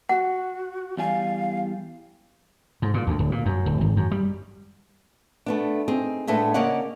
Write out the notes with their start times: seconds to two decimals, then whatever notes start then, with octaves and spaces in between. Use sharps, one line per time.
0.09 F#4 F#5
0.97 E2 G3 F5 G#5
2.82 G#2
2.94 A#2
3.07 D2
3.19 D1
3.32 A#2
3.46 F#2
3.66 D1
3.81 G#1
3.97 F#2
4.11 G3
5.46 A3 B3 D4
5.88 C4 D#4 G#4
6.27 A2 G#3 A3 B3 D4
6.54 C#3 A#3 C#4 D5 D#5 F#5